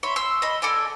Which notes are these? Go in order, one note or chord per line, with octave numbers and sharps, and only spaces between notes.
C#5 E5 B5 C6
C6 E6
D#5 B5
A4 D5 G#5